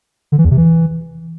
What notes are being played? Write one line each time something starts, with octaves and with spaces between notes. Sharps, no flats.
D3
E3
E2
C3
E3